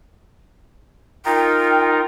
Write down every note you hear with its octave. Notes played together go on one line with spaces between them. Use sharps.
D#4 F4 A#4 G5